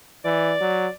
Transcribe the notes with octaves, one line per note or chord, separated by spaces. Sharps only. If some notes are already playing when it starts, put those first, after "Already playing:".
E3 D5
F#3